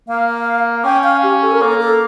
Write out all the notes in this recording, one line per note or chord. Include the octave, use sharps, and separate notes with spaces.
A#3 F5
C#4 G5
F5
G4
A4
A#4
A#3 A4
A4